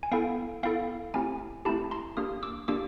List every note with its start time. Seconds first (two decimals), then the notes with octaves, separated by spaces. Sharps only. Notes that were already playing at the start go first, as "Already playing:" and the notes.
0.03 G#5
0.11 B3 E4 A4 F5 G5
0.63 B3 E4 A4 F5 G5
1.14 A3 C4 E4 G4 G#5 A#5
1.65 A3 C4 E4 G4 A5 B5
1.91 A#5 C6
2.17 A#3 D4 G4 D#6 F6
2.43 D6 E6
2.68 A#3 D4 G4 D6 E6